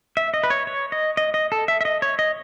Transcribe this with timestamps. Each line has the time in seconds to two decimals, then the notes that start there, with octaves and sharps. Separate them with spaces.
0.17 E5
0.34 D#5
0.43 B4
0.50 C#5
0.67 C#5
0.92 D#5
1.17 D#5
1.34 D#5
1.52 A4
1.68 E5
1.81 E5
1.85 D#5
2.02 C#5
2.19 D#5